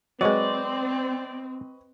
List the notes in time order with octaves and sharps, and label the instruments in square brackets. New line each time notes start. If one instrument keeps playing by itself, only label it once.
[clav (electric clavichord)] F#3 G#3 [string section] C4 [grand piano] B4 D#5 C#6 [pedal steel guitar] D5